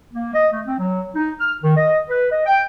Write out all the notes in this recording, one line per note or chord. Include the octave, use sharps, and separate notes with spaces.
A#3
D#5
A3
C4
F#3
D#4
F6
D#3
D#5
B4
D#5
G5